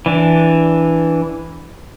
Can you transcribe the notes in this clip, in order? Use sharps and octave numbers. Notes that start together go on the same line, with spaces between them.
E3 D4